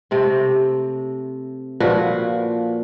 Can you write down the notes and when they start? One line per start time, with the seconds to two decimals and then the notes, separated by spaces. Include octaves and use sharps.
0.11 C3 A3 C4
1.80 A#2 F3 F#4 B4